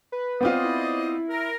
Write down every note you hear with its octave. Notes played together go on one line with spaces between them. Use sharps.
B4
B3 C4 F4 C5 D5 D#5
E4
A#4